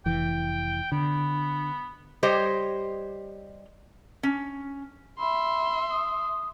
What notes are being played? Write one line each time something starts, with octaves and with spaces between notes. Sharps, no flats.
F1 E3 G5
D3 B3
G3 G4 C5 C#5 D#5
C#4
E5 B5 C6
D#6